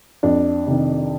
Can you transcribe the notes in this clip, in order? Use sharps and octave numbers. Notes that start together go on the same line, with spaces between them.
F2 D4
C3 D#3